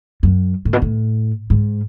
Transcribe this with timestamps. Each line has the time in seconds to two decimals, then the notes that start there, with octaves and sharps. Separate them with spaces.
0.23 F#2
0.65 A2
0.73 B2
0.82 A2
1.50 G#2